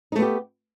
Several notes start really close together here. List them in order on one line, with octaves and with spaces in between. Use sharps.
D#4 A3 B3 G4